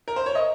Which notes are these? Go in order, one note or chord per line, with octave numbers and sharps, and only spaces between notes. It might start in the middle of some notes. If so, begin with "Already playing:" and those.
A#4
C5
C#5
D#5